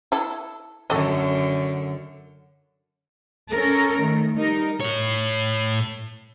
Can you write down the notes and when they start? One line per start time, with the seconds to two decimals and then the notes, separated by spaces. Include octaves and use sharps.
0.12 E4 A4
0.90 F#2 D3 A3 A4 D#5
3.51 C#4 A4 A#4
4.00 D#3 A3
4.36 G3 D#4 A#4
4.80 A2 C#5